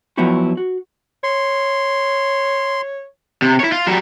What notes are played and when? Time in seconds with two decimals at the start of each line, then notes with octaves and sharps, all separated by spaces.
0.17 F3 F#3 B3 E4 F#4 G4
0.57 F#4
1.24 C#5 C6
3.42 C3
3.60 E4 C#5
3.72 F4
3.87 F#3 G3